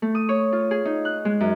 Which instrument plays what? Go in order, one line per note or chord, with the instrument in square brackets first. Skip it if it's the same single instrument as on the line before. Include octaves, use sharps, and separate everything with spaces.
[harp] A3
D#6
C#5
F4
G#4
D#4
F#6
G#3
F#2